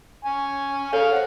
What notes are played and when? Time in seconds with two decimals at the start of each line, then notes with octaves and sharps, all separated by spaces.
0.25 G#5 C#6
0.93 A4 C#5 F5
1.12 C5 C#5 F#5